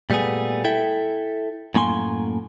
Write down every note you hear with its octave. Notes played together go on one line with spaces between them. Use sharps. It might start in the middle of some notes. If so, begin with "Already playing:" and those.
A#2 G3 A3 B3 G#4
E4 A4 E5 G5
F#2 A2 A#3 G#5 C6